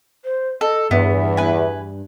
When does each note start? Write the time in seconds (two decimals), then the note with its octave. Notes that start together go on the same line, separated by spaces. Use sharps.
0.25 C5
0.61 A4 D#5
0.91 E2 G2 B3 E5
1.37 B4 G#5